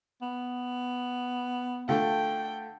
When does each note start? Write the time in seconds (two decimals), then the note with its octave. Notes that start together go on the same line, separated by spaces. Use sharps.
0.22 B3
1.89 D3 A3 F4 G5